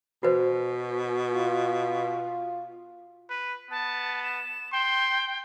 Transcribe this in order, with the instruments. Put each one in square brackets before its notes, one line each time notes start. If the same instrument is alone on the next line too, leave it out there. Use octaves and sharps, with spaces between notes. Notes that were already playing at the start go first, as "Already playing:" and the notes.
[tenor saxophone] B2 [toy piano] F#4 B4 C5
[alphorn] F4
[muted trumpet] B4
[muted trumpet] B3 [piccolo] A5
[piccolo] E7
[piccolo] G5 [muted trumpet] C6